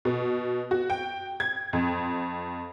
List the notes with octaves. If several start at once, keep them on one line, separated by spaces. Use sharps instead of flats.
B2
F#4
G5
G#6
F2